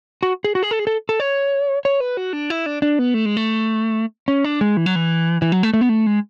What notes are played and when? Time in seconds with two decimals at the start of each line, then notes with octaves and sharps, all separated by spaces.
0.23 F#4
0.44 G#4
0.55 F#4
0.63 G#4
0.71 A4
0.79 G#4
0.87 A4
1.09 A4
1.20 C#5
1.85 C#5
2.00 B4
2.17 F#4
2.33 D4
2.50 E4
2.66 D4
2.82 D4
2.99 B3
3.14 A3
3.26 G#3
3.37 A3
4.28 C#4
4.44 D4
4.61 G#3
4.77 E3
4.86 F#3
4.95 E3
5.42 E3
5.52 F#3
5.63 A3
5.74 A3
5.81 B3
5.89 A3
6.07 G#3